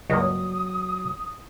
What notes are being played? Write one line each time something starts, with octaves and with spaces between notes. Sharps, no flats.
C#2 G2 F#3 A#3 D#6